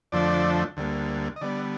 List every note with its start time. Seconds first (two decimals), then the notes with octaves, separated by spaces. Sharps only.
0.12 F2 D3 F3 A3 D4 D5
0.77 D2 D3 G3 A#3
1.36 D#5
1.41 D3 G3 B3 D5